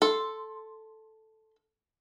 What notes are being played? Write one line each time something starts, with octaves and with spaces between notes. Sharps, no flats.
A4 C6